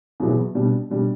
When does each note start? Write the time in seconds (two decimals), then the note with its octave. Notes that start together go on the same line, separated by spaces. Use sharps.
0.20 E2 B2 F#3 B3 E4
0.55 B2 G3 D4
0.90 B2 G3 D4